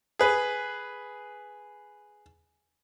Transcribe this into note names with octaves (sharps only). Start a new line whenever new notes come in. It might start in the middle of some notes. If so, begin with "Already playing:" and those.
G#4 B4